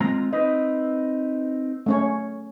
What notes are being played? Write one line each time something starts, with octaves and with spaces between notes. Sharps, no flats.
G#3 C4 F4 A#5
C4 D#4 B4 D#5
A3 C#4 C#5